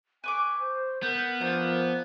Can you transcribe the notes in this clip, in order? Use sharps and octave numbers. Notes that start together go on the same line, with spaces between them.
B4 G#5 C#6 D6
C5
B3 A#4 G6
F3 D4 C5 A#5